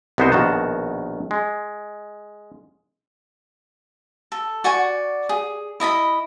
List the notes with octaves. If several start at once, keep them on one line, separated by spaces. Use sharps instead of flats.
C2 C3 B3 D#4 C5 G5
A#1 B2 D#3 F#4 A5
G#3
A4
F#4 D5 G#5 C#6
G#4
E4 D#5 A5 B5